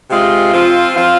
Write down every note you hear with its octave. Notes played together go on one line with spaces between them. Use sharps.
C3 G#3 F4
F3 C4 F4
F3 C4 F4